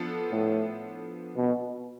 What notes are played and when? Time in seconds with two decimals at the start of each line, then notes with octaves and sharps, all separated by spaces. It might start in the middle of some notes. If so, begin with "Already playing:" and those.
Already playing: F3 B3 D4 F4 A4
0.32 A2
1.37 B2